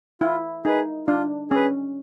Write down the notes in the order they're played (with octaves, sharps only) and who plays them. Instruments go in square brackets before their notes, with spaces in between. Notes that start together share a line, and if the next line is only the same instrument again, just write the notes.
[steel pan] E4 [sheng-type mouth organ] F4
[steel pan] D#4 [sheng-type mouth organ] G#4 B4
[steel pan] D4 [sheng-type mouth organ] F4
[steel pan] C#4 [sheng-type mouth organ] G#4 B4